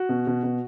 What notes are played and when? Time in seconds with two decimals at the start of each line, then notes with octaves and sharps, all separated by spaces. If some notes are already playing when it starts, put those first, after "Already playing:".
Already playing: F#4
0.09 B2
0.27 B2
0.43 B2